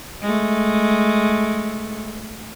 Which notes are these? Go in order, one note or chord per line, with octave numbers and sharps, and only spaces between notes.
G#3 A3